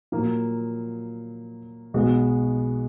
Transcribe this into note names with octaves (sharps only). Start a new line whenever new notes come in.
A#2 F#3 A#3
B1 B2 G#3 B3 F#4